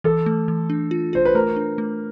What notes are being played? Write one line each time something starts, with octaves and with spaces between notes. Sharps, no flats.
E3 A4
A3
E3
D4
F4
F4 C5
B4
A3 A#4
D4
A3